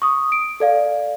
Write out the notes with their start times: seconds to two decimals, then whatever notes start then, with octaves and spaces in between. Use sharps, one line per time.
0.02 C#6 D#6
0.32 D7
0.60 A4 D5 F5